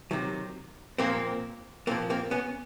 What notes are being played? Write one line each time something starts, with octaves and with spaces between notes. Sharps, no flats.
C3 D#3 F#3
A#2 F3 A#3 C4
A#2 F3 A#3 C4
A#3 C4
B3 C#4